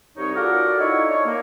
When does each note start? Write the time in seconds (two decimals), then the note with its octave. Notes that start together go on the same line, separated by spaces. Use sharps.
0.17 C2 D#4 C#5
0.35 F4 F#4 A4 A#4 D5
0.78 D#4 E4 C#5
1.09 D4 C#5
1.26 A#3